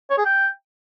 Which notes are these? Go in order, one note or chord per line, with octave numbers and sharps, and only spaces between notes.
C#5
G#4
G5